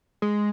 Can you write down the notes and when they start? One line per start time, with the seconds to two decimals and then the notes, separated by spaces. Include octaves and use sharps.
0.22 G#3